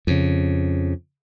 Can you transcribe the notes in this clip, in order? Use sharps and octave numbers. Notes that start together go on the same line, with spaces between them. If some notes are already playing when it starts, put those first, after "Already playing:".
F2 C#3